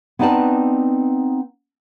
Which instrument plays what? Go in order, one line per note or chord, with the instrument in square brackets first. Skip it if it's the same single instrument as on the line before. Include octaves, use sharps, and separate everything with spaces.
[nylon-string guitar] B3 C4 D#4 B4 D5 A5